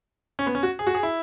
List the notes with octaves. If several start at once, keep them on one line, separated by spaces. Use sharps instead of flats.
C#4
B3
C#4
F#4
G#4
F#4
G#4
E4